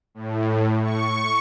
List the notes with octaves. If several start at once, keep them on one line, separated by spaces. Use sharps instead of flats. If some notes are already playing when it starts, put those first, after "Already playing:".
A2
C#6